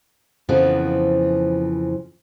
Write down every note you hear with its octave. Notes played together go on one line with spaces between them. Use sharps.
F2 C#3 E3 F3 B3